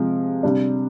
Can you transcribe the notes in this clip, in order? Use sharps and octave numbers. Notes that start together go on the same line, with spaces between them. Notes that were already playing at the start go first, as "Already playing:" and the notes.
Already playing: C3 F3 G#3
C3 G3 D4